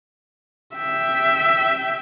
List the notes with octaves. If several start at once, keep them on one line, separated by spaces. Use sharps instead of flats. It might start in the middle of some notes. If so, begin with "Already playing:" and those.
E5 G5